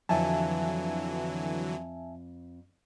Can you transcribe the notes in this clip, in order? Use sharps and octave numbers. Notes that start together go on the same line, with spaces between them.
F2 D3 E3 F#3 E5 G#5 A5